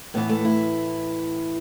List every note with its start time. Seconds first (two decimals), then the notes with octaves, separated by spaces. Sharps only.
0.14 A2 E3 B3
0.29 A3
0.45 E4